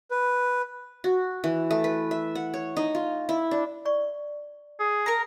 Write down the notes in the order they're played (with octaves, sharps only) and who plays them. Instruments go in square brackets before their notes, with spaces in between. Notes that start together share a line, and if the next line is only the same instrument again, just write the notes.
[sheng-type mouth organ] B4
[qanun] F#4
E3
A3
B4
E5
F#5
C#5
D#4
F4
E4
D4
[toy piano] D5 C#6
[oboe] G#4
[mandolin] A#4 A#5